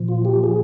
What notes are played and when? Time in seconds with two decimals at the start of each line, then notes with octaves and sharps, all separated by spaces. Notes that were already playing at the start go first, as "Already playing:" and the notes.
Already playing: A#2 F3
0.08 F4
0.25 G4
0.44 G#4